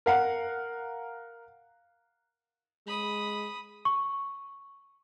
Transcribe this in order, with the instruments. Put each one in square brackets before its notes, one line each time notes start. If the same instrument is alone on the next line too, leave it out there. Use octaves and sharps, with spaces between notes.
[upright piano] A#4 F5 F#5
[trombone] G#3 [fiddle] B5 D#6
[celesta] C#6